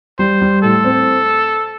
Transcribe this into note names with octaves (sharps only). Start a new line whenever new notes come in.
G3 C5
G3
A2 A4
C4